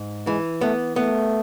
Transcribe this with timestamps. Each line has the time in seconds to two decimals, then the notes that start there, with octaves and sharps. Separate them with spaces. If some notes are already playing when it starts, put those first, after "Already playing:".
Already playing: G#2
0.27 E3 G#3
0.61 A3 B3
0.96 A3 B3